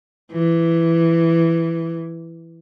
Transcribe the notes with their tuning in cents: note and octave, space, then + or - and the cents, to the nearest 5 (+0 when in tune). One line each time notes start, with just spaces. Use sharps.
E3 +10